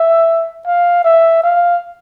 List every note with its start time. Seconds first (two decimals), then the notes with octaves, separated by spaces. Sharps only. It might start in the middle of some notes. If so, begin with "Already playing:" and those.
Already playing: E5
0.66 F5
1.05 E5
1.44 F5